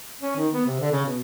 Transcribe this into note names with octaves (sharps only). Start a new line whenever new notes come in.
C#4
D#3
B3
C3
D3
C#3
B2